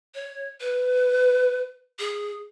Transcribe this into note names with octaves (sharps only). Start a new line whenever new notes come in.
C#5
B4
G#4